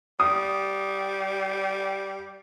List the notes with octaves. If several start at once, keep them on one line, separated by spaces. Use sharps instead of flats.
G3 D#6